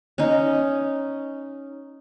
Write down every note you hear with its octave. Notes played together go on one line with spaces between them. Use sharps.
C#4 D#4